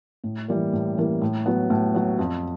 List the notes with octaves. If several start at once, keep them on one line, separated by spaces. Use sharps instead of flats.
A2
E3 G3 A#3
A2
E3 G3 A#3
A2
F#3 B3
A2
F#3 B3
F2